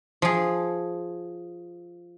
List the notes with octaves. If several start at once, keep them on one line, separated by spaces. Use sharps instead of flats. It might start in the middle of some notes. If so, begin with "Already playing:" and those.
F3 G#4